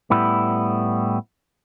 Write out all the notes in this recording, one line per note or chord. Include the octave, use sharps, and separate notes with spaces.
A2 G3 B3 E4